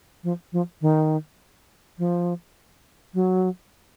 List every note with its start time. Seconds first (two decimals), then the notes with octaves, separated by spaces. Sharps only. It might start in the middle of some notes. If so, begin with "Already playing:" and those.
0.24 F3
0.53 F3
0.81 D#3
1.98 F3
3.14 F#3